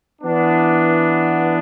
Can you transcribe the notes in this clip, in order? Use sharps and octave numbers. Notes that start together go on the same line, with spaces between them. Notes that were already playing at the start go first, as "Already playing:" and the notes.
E3 B3 D4